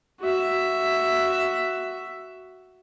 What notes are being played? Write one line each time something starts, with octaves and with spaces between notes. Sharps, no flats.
F#4 E5